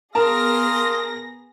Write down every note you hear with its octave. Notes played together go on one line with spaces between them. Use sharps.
B3 G#4 A#4 F5 A5 C6 D#6 A#6